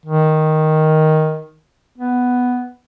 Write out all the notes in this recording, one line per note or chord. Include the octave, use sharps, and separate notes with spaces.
D#3
B3